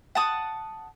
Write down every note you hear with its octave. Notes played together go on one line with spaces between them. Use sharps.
F#5 A5 D#6